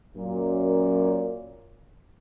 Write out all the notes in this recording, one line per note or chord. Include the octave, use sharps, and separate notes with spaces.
F#2 A#2